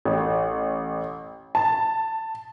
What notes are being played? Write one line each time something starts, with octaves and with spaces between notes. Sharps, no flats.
A1
A5